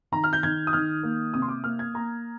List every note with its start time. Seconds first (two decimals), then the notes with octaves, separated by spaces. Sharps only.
0.12 D#3 A#5
0.24 F6
0.33 G6
0.43 D#3 G#6
0.67 D#6
0.73 D#3 F6
1.03 A#3
1.34 C3 D#6
1.42 C6
1.48 D6
1.64 A#3 F6
1.79 G#6
1.94 A#3 A#5